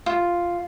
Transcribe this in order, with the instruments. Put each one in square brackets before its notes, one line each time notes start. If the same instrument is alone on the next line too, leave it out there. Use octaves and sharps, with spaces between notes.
[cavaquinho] F4